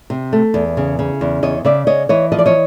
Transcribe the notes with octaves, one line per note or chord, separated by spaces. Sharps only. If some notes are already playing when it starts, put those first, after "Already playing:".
C3
A3
E2
C#3
C#3
E2
E2 C#5 D#5
C#3 D5 E5
C#3 C#5 D#5
E3 C#5 D#5
F3 D#5
D5
C#5 D#5